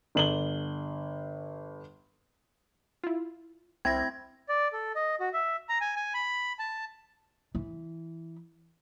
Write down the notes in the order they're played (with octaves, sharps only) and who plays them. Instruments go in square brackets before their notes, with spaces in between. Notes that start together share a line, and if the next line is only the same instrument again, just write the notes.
[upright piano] G1 F#7 G7
[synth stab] E4 F4
[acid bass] C2 [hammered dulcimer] C4 E4 G5 [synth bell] G#6 A#6
[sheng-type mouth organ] D5
A4
D#5
F#4
E5
A#5
G#5
G#5
B5
A5
[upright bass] E3